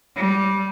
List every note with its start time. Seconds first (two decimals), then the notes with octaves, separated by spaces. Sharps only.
0.16 G3